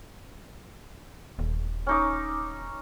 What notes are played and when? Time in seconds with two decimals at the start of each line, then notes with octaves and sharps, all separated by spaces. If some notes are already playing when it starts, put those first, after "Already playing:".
1.39 D#1
1.87 C#4 D#4 D6